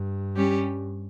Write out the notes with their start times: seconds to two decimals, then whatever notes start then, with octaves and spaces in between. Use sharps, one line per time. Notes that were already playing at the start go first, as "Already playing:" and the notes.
Already playing: G2
0.36 G3 C#4 G4